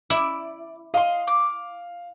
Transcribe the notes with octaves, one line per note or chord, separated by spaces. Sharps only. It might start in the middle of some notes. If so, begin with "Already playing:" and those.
E4 D5
D#5 F5 C6
D6